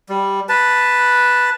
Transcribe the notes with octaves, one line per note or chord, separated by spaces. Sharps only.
G3
B4 A5